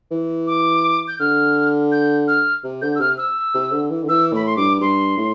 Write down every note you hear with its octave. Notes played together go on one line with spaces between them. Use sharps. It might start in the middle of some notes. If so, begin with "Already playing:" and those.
E3
D6
G6
D3 F6
G6
F6
C3
D3 G6
E6
C3 F6
E6
C3
D3
E3
D3
E3 E6
A2 B5
C6
G2 D6
G2 C6
A2